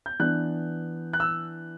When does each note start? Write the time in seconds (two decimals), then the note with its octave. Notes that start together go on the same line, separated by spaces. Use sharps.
0.06 G6
0.20 E3 B3 D4 F#6
1.13 F#6
1.20 E6